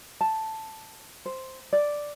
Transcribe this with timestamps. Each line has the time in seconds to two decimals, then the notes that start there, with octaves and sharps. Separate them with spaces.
0.21 A5
1.26 C5
1.73 D5